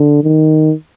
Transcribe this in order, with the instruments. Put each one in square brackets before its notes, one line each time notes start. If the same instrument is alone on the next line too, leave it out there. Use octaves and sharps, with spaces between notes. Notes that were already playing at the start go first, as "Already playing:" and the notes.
Already playing: [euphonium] D3
D#3